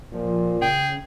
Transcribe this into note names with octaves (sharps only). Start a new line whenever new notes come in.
A#2 F3
C#3 G#4 G5